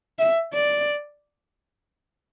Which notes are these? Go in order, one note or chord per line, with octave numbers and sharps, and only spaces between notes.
E5
D5